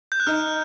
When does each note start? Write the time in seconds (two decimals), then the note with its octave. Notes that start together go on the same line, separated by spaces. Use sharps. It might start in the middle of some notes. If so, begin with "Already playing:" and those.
0.12 G6
0.20 F#6
0.27 D#4 F6